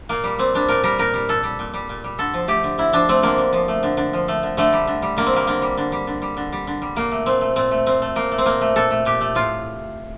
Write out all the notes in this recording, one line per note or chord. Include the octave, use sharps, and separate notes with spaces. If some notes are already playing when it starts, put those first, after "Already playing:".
A#2 A#3
G3
A#2 C4
G3 D4
A#2 A#4
G3 A#4
A#2 A#4
G3
A#2 A4
G3
A#2
G3
A#2
G3
D3 A4
F3
A3 G4
D3
D3 E4
F3 D4
A3 C4
D3 A#3
D3
F3
A3
D3
D3
F3
A3
D3
D3 A3
G3
D3
G3
D3 A#3
C4
G3 A#3
D3 A#3
G3
D3
G3
D3
G3
D3
G3
D3
G3
A#2 A#3
A3
A#2 C4
A3
A#2 C4
A3
A#2 C4
A3
A#2 A#3
A3
C4
A#2 A#3
A3
A#2 A4
A3
A#2 G4
A3
A2 F4